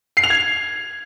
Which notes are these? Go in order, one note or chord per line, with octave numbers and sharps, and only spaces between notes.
C7
F7
G#6